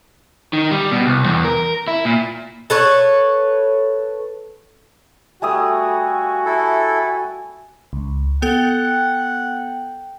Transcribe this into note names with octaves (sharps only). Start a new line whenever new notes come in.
D#3
G3
B2
C2
E2
A#4
E4
A#2
A4 B4 C#5
G3 A3 F#4 G#5 D#6
E4 A4 G#5
C#2
B3 A4 F#5 G5